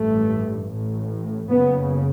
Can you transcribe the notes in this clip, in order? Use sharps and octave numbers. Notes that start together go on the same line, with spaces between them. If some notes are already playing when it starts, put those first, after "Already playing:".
Already playing: A1 G2 A3
A1 A2
F#1 F#2 C#3 B3